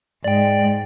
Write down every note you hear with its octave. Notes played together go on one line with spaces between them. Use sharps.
G#2 D5 G5